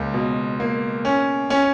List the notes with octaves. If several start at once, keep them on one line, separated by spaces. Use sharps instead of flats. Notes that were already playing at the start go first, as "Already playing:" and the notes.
Already playing: C#2 A#3
B2
A#3
C#4
C#4